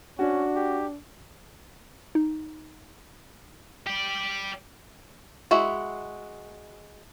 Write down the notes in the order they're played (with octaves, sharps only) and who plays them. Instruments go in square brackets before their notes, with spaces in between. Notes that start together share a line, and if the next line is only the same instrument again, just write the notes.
[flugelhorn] C#4 [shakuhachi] D4 [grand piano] F#4
[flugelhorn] G4
[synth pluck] D#4
[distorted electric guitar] G4 D5
[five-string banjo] G#3 E4 F#4 E5